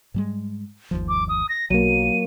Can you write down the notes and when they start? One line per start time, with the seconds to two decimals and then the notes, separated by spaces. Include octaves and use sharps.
0.14 G#2 G3 G#3
0.91 G1 D#2 F3
1.09 D6
1.29 D#6
1.49 A#6
1.70 B1 F#3 A#3 D#7